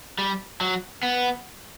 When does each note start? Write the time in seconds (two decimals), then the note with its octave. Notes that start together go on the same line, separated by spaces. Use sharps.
0.19 G3
0.61 F#3
1.03 B3